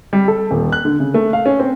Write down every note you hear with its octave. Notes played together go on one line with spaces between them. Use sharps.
G3
A4
D#1
F#6
D3
C#3
A3
F5
C#4
C4